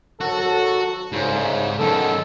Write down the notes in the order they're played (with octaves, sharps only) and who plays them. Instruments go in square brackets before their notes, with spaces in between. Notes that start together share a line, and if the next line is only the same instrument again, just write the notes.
[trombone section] G#1 F#3 A4 [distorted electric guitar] F#4
[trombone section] C2 C#3 [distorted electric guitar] G#2
[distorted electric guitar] F#2 D#3 [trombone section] G#3 B3 A4